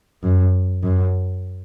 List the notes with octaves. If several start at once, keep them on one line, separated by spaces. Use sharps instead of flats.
F#2
F#2